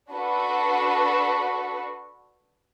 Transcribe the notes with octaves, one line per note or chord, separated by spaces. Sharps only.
D4 F#4 A4 B4